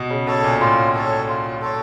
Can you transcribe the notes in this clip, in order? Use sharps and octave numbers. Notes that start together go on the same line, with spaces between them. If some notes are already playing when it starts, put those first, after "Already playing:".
Already playing: B2
C#3
B2 A4 C#5
A#2
A2 F4
A4 C#5
F4
A4 C#5